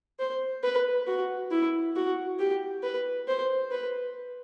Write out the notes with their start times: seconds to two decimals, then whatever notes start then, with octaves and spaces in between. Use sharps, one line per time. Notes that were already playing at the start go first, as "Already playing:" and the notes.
0.19 C5
0.64 B4
1.07 F#4
1.51 E4
1.96 F#4
2.39 G4
2.83 B4
3.28 C5
3.72 B4